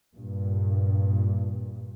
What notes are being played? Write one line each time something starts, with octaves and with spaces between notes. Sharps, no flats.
G2 A#2